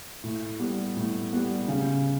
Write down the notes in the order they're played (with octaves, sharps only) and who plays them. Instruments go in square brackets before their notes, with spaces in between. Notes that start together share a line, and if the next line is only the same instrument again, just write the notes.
[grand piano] A2
G3 B3
A2
G3 B3
C#3